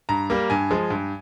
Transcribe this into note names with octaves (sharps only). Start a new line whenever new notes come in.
G2 A#5
G3 A#3
G2 G#5
F3 G#3
G2